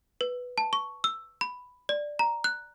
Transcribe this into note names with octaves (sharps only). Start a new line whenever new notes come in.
B4
A5
C#6
E6
B5
D5
A#5
F#6